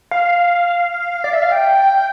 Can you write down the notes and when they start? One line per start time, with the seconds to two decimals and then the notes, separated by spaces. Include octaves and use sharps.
0.11 F5
1.24 D5
1.33 E5
1.42 F5
1.52 G5